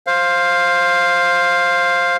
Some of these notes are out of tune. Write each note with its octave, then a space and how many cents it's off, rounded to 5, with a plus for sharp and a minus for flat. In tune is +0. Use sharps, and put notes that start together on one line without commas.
C5 +15 F5 +0